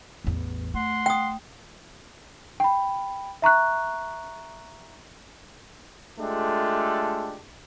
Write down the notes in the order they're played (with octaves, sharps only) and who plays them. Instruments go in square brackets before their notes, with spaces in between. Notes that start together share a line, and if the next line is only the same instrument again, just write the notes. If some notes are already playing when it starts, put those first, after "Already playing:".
[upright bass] A1 E2
[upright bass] A3 [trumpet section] F#5 C6
[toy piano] G5 D#6
[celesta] G5 B5
E5 A#5 C#6 F#6
[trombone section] G#3 A3 D4 F4 G4 A4